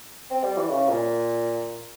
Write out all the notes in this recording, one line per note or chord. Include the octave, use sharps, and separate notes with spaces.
C4
G3
E3
C#3
A#2